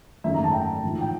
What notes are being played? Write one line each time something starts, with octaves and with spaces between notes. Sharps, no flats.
G#1 F#2 C#3 F#3 A3 E5
A#5
A5
G5
A1 G#2 F3
G5